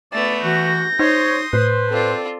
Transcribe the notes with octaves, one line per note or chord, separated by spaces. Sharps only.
A3 B3 D5 A6
E3 F#4 G6 A#6
D#4 C5 C#5 C6 D#6
A2 B4 C5
C4 F4 A4 D5